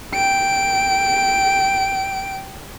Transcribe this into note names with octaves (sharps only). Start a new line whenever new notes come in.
G5 D7